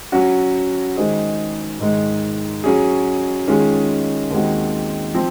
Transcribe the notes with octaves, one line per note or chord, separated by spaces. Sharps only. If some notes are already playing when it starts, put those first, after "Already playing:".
F#3 C#4 F#4
D#3 G#3 D#4 G#4 C5
G#2 D#3 G#3
F#3 C#4 G#4
D#3 G#3 C#4 F4 G#4
D#2 D#3 G#3 C4 F#4
F3 C4